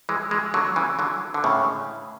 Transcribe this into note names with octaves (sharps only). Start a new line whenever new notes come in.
E3 G#3
E3 G#3
D3 F#3
C#3 E3
D3 F#3
D3
A2 C#3